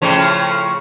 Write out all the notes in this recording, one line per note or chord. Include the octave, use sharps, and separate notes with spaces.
A2 C#3 F3